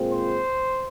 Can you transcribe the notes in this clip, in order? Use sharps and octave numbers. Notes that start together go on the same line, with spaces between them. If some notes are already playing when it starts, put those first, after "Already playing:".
Already playing: A#2 G#3 C4 F4
C5